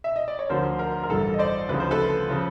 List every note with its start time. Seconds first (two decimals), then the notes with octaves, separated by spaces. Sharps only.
0.04 E5
0.16 D#5
0.28 D5
0.39 C#5
0.49 D2 D3 F3 A#4 C5
0.79 A#4
1.03 A#4
1.09 A1 G2 E3 A4
1.34 D#5
1.39 C5 D5
1.69 D2 C#3 F3 B4
1.80 C5
1.91 A4 B4
2.29 C#3 F3